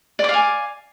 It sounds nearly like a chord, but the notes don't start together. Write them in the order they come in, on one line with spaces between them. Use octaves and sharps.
D5 D6 F5 G#5